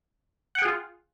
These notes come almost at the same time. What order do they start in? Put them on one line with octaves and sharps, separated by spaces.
F#5 G5 G#4 F4